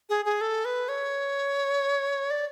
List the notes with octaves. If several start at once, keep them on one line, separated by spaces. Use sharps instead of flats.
G#4
G#4
A4
B4
C#5
D5